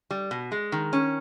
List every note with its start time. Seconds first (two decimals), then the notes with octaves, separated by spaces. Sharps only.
0.11 G3
0.31 B2
0.52 G#3
0.72 D#3
0.93 C#4